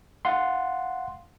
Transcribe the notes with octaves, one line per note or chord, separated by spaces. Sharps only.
F5 F#5 C6